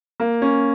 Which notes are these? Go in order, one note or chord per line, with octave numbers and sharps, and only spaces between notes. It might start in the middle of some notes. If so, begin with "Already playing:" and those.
A#3
C#4